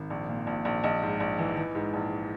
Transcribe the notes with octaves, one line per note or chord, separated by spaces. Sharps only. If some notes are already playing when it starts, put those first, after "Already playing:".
Already playing: G#1
A#1
A#2
A#1
A#1
A#1 D#5
G#2
A#1
E3
E3
G#2
A#1